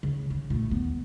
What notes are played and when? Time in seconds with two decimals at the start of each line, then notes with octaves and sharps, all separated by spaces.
0.03 C#3
0.30 C#3
0.50 A#2 A3
0.71 D#2 B3